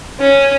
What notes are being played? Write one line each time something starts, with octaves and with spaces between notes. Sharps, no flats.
C#4